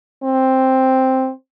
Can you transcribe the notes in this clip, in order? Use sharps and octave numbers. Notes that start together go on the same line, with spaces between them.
C4